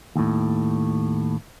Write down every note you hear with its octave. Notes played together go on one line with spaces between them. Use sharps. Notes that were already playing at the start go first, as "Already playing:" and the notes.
D#2 A2